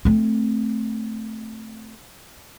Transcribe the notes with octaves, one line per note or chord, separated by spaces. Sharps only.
A3 C4